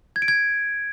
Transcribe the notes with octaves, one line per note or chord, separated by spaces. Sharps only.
G#6
D7
G#6